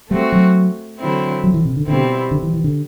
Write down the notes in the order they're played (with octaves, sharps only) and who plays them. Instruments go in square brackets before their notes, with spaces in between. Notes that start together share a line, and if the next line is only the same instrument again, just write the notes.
[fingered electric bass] G3 [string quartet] A3 C4 F#4
[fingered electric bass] F#3
[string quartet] D3 F#3 C4 E4
[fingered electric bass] F#3
E3
C3
D3
[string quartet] B2 G3 C4 E4 [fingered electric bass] D3
[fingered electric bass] D3
E3
E3
D3